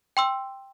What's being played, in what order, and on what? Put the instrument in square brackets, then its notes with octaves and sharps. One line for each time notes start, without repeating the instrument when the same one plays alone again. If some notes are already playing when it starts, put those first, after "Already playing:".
[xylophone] G5 C6 E6